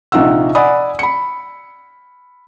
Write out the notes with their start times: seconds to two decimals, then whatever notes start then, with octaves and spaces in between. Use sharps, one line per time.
0.12 A#1 C3 D#4 F4 F#5 E6
0.55 D5 F#5 G#5 B5 D#6
0.99 B5 C#7